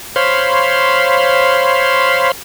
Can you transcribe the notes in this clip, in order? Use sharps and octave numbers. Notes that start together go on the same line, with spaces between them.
C5 C#5 F5 B5 C6